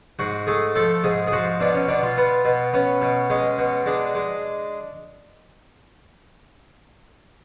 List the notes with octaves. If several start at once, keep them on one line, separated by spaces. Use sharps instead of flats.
G#2 F#4
A3 G#4
F3 A4
G#2 G#4
G#4
F3 F#4
B2 D4
C#4
B2 D4
F4
B3
B2
B3 C#4
B2
G#3 C#4
B2
G#3 D4
G#3